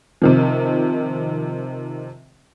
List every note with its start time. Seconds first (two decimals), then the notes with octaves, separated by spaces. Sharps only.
0.22 C3 D#3 F3